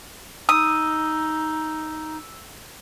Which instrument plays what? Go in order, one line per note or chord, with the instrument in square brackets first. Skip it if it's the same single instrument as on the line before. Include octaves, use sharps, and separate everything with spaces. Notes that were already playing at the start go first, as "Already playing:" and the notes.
[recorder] D#4 [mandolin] D#6 [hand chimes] E6